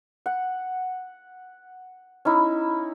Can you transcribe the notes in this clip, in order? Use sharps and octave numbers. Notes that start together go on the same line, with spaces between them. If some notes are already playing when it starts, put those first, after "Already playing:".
F#5
C#4 D#4 E4